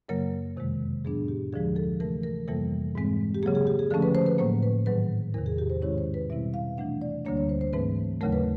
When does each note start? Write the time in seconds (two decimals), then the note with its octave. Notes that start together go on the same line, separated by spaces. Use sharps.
0.09 F#2 C#3 F#3 A#3 A#4
0.57 F2 C3 D#3 G#3
1.04 A2 F#3 B3 D4 G#4
1.28 G4
1.53 D2 D3 F3 G#3 G#4
1.76 A4
2.00 C3 E3 A3 A#4
2.23 A#4
2.47 F2 C3 E3 G3 A#3 A4
2.95 G#2 E3 G#3 C4
3.35 G4
3.43 C#3 F#3 A#3 G#4
3.55 G#4
3.67 G4
3.79 G#4
3.91 D3 F3 A3 C#4 A4
4.02 B4
4.15 C5
4.26 B4
4.38 A2 F#3 A#3 C5
4.63 B4
4.86 G#2 D#3 F#3 B4
5.34 E2 C3 D#3 A#4
5.46 G#4
5.58 G4
5.70 C5
5.82 G#2 D#3 G#3 C#4 E4 C#5
5.98 C5
6.14 B4
6.30 B2 G3 C4 E4 E5
6.54 F5
6.77 C3 E3 A3 D4 F#5
7.02 D5
7.25 D2 D3 G3 A#3 D4 C#5
7.37 C#5
7.49 C5
7.61 C5
7.73 G#2 E3 A3 C4 B4
8.21 D#2 C#3 F#3 A3 A#4
8.33 B4